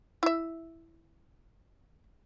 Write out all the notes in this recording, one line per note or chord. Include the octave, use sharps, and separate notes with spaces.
E4 E5